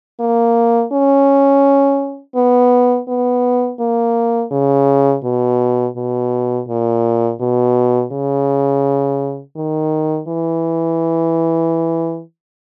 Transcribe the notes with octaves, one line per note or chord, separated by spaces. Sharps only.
A#3
C#4
B3
B3
A#3
C#3
B2
B2
A#2
B2
C#3
D#3
E3